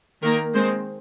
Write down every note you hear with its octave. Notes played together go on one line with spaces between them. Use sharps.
D#3 A#3 A#4
D#3 G#3 C4 C5